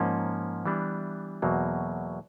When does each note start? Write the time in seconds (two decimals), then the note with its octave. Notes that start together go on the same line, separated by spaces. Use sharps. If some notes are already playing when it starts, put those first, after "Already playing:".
Already playing: G#2 F3 A#3 C#4
0.66 E3 G3 B3 D4
1.42 E2 B2 F#3 A#3